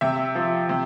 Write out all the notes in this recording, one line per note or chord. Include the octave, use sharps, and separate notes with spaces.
C3 E5
F3
C3